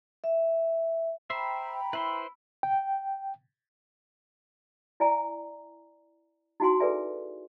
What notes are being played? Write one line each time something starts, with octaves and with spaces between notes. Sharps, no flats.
E5
C5 E5 G5 A#5 B5
E4 B4 C5 C6
G5
E4 D5 E5 G#5 A#5
D#4 E4 F#4 F#5 G#5 C6
G#4 A4 B4 D5 E5 G#5